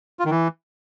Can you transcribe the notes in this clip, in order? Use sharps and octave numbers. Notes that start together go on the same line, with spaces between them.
F4
D#3
E3